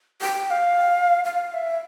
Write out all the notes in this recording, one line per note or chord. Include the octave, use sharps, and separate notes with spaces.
G5
G5
F5
F5
F5
E5